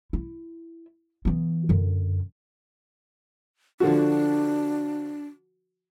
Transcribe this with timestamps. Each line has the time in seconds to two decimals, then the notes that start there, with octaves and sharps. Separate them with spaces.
0.13 E4
1.25 E3 B3
1.69 F#2 D3
3.80 D3 F3 D4 F#4